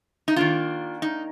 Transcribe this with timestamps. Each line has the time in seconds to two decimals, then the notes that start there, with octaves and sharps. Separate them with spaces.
0.28 D#4
0.36 D#3 A#3 D4 F4
1.02 D#4